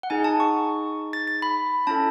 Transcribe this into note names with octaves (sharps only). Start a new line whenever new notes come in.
F#5
D#4 G#4 G#5
A5
C#6
A6
A6
B5
C#4 E4 A4 A5